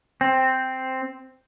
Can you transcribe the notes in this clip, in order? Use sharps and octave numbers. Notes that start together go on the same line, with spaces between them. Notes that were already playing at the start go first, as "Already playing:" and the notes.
C4